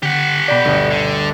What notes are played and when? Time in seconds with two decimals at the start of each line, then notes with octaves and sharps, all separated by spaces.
0.03 D3 G4 F#5
0.48 B2 D5 G5 B5
0.65 G1 D2
0.90 D3